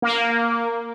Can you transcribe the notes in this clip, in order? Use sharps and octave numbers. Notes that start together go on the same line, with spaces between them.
A#3